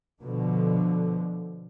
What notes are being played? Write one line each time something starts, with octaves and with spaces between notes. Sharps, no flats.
B2 D3 F3